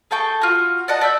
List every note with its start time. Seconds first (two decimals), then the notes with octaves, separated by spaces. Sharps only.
0.11 G#4 A4 G5 C#6
0.41 F4 F#4
0.88 D5 D#5 F#5 A5
1.01 D5 E5 E6 G6